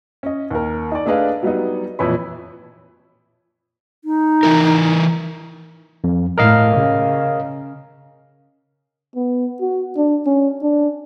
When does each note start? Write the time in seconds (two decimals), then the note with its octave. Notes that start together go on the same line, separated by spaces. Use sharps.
0.23 C#4 D#5
0.51 D#2 A#4
0.92 D#4 D5
1.06 A3 D4 G#4 B4 D#5 F5
1.43 F#3 G3 B3 D#4
1.99 F2 A#2 E3 E4 C#5 B5
4.05 D#4
4.43 E3 E4 A#4
6.04 F2
6.38 A2 A#4 D#5 F5
6.75 C#3
9.16 B3
9.61 F#4
9.97 D4
10.26 C#4
10.63 D4